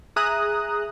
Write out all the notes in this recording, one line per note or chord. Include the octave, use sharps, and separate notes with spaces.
G#4 E5 A#5 D#6 F#6